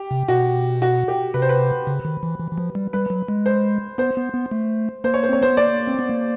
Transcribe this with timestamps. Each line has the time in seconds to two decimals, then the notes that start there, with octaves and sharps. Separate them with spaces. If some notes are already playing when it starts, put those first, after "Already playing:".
Already playing: G4
0.11 C3
0.28 B2 F#4
0.82 F#4
1.08 G4
1.34 C3 B4
1.42 C5
1.49 B4
1.87 C#3
2.05 D#3
2.23 E3
2.40 E3
2.51 E3
2.58 F3
2.75 G3
2.93 G3 B4
3.10 F#3
3.28 G#3
3.46 C5
3.98 B3 C5
4.16 B3
4.34 B3
4.51 A3
5.04 A#3 C5
5.14 C#5
5.23 C5
5.29 C4 C#5
5.42 B3 C5
5.57 A#3 D5
5.87 C4
5.99 B3
6.10 A#3